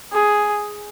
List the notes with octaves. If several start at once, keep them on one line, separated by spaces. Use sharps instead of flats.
G#4